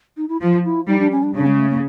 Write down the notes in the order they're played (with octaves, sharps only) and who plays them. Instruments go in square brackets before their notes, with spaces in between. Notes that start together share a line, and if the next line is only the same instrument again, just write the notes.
[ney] D#4
E4
[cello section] F3 [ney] F4
[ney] E4
[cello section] G3 [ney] D#4
[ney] D4
C#4
D4
[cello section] C#3 [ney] D4
[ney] G#3
A3
A#3